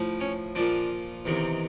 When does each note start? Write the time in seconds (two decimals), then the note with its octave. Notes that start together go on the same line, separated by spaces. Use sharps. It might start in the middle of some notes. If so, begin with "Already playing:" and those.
Already playing: A2 F3
0.20 C#4
0.55 A#2 F3 D4
1.25 E2 C3 D#3